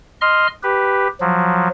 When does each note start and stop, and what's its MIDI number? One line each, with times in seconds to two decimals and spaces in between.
0.21 0.47 75
0.21 0.47 84
0.21 0.47 89
0.63 1.08 67
0.63 1.08 71
1.21 1.68 53
1.21 1.68 54